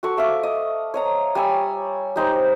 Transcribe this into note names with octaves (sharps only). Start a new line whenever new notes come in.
F#4 A4 C#6
A3 E5 F5 D6
D#5
C#5 D#5 A#5
G3 C#5 G#5 E6
G3 D#4 C5